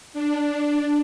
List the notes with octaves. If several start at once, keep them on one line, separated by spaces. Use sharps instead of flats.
D4